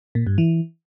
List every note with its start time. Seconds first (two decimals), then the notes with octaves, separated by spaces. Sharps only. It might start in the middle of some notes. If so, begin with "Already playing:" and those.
0.15 A#2
0.27 G2
0.38 E3